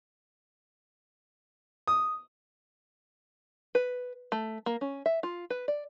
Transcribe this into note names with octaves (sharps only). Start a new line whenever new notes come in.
D#6
B4
A3
A#3
C#4
E5
F4
B4
D5